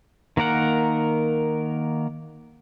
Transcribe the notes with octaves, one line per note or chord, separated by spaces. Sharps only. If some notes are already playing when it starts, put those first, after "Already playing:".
D#3 A#3 A#4 F#5